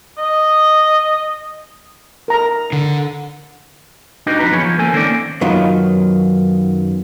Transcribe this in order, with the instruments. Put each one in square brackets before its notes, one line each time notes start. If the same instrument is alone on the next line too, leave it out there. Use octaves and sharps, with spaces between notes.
[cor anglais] D#5
[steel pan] A#4 A#5
[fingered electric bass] D3
[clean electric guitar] D4 D#4 F#4 G4 B4 D#5
F2 C#3 D#4 B4 A#5
F3 B3 G#4 C#5
F3
A#3 C#4 A4 C5 G#5
D#3 A#3 C4 C#4 D5
[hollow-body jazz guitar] F#2 D#3 F#3 B3 D#4 F4